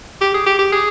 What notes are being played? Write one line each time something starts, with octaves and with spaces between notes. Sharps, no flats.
G4
G#4
G4
G4
G#4